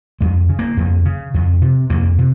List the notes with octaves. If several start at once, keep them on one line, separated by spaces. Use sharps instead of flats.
F2 G#3
C#3
A#3
F2
C#3
F2
C3
F2 A#3
C3